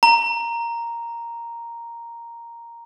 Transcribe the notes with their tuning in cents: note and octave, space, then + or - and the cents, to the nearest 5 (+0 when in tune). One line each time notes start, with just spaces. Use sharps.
A#5 +0